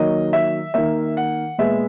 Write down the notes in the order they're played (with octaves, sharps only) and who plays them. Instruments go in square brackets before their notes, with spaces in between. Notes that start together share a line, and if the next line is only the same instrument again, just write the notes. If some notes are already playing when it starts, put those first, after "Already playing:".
Already playing: [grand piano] D#3 F#3 A#3 D#5
E5
D#3 A#3 E5
F#5
A#2 G#3 B3 E5